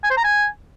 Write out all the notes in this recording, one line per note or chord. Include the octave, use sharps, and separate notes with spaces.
G#5
C5
A#5
G#5